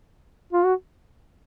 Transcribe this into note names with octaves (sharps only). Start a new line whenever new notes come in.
F4
F#4